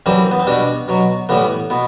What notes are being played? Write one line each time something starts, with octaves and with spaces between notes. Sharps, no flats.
F#2 E3 G3 C4
B3
C4
B2 G3 D4
B2 F#3
A2 E3 G3 B3
B2 B3